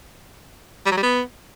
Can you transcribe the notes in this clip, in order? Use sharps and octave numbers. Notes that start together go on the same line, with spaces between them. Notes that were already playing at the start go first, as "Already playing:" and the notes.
G3
F#3
G3
B3